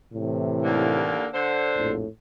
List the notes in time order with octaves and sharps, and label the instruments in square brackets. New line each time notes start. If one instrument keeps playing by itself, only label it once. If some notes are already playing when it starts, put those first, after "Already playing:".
[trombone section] A2 C3 E3
[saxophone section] D#2 D3 A#3
D3 C5
[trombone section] A#1 F2 A2